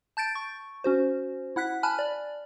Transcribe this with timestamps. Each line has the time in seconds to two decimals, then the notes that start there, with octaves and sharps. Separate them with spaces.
0.17 A5 G6 A6 D7
0.35 C#6
0.84 C#4 F#4 C5
1.56 E4 F#5 F#6 B6
1.83 G#5 A5 B5 F6 F#6
1.99 D5